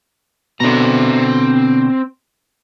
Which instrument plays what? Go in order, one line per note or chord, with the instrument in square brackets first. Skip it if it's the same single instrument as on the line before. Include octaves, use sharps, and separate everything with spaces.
[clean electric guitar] B2 D3 [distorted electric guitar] C4 A#5